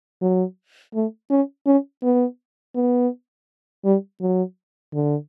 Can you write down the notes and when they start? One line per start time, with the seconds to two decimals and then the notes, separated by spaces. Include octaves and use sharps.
0.22 F#3
0.94 A3
1.30 C#4
1.66 C#4
2.03 B3
2.75 B3
3.85 G3
4.21 F#3
4.94 D3